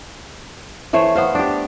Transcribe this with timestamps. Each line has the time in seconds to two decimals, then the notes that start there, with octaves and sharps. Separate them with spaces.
0.93 E3 A3 C5 C#5
1.15 B3 C5 F5
1.35 D4 G4